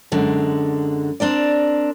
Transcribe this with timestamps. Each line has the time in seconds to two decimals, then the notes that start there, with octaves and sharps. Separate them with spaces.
0.12 F#2 D3 G#3
1.20 C4 D4 A#4 D5